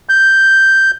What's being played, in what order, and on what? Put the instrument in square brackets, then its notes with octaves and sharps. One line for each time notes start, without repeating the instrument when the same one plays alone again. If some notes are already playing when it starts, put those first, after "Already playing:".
[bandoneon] G6